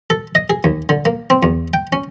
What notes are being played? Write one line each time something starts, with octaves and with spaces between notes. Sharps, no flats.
A4
D#5
G#4
D#2
D3
A#3
C4
E2
G5
C#4